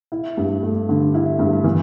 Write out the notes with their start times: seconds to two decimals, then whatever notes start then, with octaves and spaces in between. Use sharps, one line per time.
0.12 E4
0.37 G2
0.63 A3
0.89 D3
1.14 E4
1.39 G2
1.64 E3